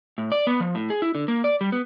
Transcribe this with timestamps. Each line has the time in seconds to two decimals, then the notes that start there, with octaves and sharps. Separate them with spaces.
0.18 A2
0.32 D5
0.47 B3
0.60 F3
0.75 A2
0.90 G#4
1.02 E4
1.15 D3
1.28 A#3
1.44 D5
1.61 G3
1.72 B3